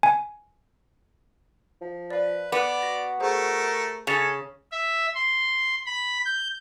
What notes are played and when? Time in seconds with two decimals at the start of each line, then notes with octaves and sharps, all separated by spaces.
0.03 G#5
1.81 F3
2.11 B4 D5 F5
2.52 B3 D5 D6 F#6
2.82 F#4 A#6
3.20 A3 G#4 A#4 C5 F#5
4.07 C#3 C#4 A4 G#5 A6 C#7 F7
4.72 E5
5.15 C6
5.86 B5
6.25 G6